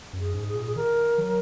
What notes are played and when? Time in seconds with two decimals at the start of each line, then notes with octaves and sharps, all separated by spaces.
0.13 F#2
0.20 G#4
0.34 G#2
0.48 G#4
0.55 A#2
0.67 G#4
0.76 D#3 A#4
1.18 F#3